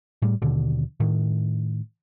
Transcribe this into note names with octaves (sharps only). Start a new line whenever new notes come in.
A2 G3
D#2 B2 D3
A2 D#3